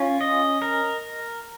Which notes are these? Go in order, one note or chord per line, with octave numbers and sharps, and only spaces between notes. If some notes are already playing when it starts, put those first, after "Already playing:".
Already playing: C#4 F4
D#5
A#4